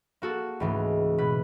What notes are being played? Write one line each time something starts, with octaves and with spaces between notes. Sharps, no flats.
A#3 F#4 A4
C#2 G#2 E3 G#3 A3
B2 B4